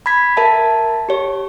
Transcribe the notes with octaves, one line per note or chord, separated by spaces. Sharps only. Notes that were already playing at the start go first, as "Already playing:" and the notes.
B5 G#6 B6
A#4 E5 A5
G4 C#5